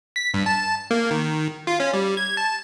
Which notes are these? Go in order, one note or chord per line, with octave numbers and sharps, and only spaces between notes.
B6
G2
A5
A#3
D#3
F4
C#4
G3
G#6
A5